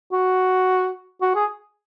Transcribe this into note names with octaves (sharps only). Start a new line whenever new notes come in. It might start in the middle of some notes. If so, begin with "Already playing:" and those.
F#4
F#4
G#4